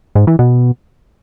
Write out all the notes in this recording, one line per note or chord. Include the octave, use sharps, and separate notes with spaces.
G#2
E3
B2